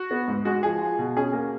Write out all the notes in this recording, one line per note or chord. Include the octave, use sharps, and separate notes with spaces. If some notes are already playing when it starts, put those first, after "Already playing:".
Already playing: F#4
B3
G#2
G#3 F#4
F3 G#4
F4
B2
C#4 G#4
A#3